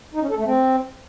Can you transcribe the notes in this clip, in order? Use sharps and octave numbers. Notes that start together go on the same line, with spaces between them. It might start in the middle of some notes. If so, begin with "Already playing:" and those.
D#4
C#4
A4
A3
C4